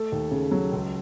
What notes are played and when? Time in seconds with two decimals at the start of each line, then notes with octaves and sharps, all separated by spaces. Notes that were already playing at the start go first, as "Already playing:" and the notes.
Already playing: A3 A4
0.12 D#2
0.31 C#3
0.51 F#3
0.72 C#2